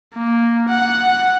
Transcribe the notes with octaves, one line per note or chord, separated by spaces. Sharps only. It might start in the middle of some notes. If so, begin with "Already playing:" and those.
A#3
F#5